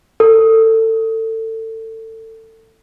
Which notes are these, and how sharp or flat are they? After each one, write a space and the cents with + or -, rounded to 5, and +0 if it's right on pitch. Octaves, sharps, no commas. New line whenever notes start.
A4 +25